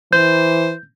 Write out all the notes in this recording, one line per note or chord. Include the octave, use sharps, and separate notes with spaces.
E3 C5 G6